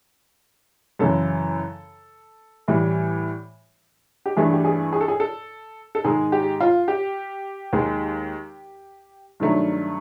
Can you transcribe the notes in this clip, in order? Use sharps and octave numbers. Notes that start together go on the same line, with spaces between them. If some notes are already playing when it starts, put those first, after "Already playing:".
F#2 C#3 E3 A4
A2 E3 G3
G4
G2 E3 A3 G#4
G4
G#4
G#4
A4
G#4
A4
A4
G#2 D#3 G#3 G#4
G4
F4
G4
D#2 D#3 G#3
G2 D#3 F#3 A3